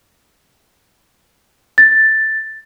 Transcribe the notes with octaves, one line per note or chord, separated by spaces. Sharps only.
A6